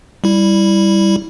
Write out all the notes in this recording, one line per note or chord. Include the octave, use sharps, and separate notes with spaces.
G3 E4